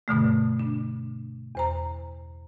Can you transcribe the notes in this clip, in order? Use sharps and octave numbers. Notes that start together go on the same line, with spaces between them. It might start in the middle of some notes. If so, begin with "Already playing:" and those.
G2 B2 D3 A3
D4
E2 C5 A#5